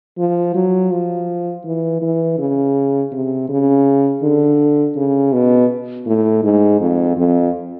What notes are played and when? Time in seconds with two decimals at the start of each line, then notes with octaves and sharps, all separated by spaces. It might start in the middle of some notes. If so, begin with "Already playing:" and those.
0.18 F3
0.55 F#3
0.91 F3
1.65 E3
2.02 E3
2.39 C#3
3.12 C3
3.49 C#3
4.23 D3
4.96 C#3
5.33 B2
6.06 A2
6.43 G#2
6.81 F2
7.17 F2